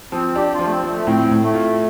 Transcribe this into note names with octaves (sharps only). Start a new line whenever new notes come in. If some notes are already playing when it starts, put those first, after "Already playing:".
F3 C4
D4 G4
F4
F3
A3
C4
F3
A3
A2 C4
A2
A3
F4